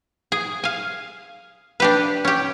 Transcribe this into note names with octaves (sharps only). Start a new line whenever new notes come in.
G#4
F5 G#5
D4 G4 B4
C#4 G4